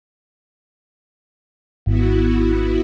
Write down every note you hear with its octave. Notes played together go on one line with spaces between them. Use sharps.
G#1 B3 E4 F#4